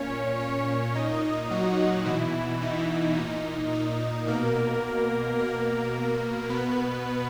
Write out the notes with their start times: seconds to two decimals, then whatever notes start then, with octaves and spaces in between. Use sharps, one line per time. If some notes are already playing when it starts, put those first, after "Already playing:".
Already playing: A#2 C#4 C#5
0.40 C#4 C#5
0.94 A#2 D#4 D#5
1.50 F#3 F#4
2.05 B2 E3 E4
2.62 D#4
3.17 A#2 D#4
3.73 D#4
4.27 B2 A#3 A#4
5.39 B2 A#3 A#4
6.50 B2 B3 B4